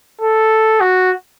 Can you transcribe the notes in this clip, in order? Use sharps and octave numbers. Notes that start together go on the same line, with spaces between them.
A4
F#4